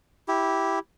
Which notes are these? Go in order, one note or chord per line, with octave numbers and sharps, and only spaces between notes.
E4 G4